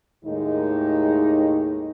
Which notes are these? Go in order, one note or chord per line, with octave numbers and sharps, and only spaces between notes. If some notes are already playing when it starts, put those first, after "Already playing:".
D#2 A2 D#3 G#3 D#4